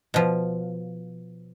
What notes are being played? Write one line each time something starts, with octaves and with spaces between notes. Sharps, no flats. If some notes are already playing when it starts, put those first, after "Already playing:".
B2 F3